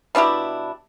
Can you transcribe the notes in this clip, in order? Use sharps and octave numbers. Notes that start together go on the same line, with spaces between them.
B2 D4 E4 G4